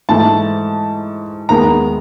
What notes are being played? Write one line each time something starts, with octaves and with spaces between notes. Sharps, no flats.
G#2 E3 A3 A5
D#2 D#3 G#3 B3 A#5